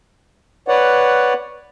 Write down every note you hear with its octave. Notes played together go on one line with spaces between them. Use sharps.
B4 C#5 D5 F#5